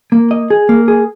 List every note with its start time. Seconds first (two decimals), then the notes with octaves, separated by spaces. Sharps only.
0.12 A#3
0.31 D#5
0.50 G#4
0.69 A#3
0.88 G#4